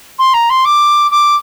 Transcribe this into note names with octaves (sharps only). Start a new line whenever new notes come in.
C6
A#5
C6
D6
D6